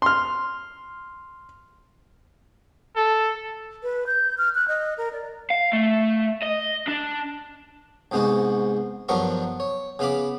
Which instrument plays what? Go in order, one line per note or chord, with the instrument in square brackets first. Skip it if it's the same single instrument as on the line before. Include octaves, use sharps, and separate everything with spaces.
[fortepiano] C6 F6
[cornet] A4
[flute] B4
G6
F6
F#6
D#5
A#4
D5
[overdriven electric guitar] F5
A3
D#5
D4
[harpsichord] C2 G#2 G#3 B3 F#4
G2 F3 F#3 B3 A#4 C#6
C#5
C#3 B3 F5 B5 D6